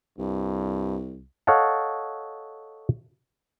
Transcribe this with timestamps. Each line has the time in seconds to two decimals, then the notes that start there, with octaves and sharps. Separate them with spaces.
0.18 C2 G2
1.47 A4 C#5 D#5 F5 F#5 A5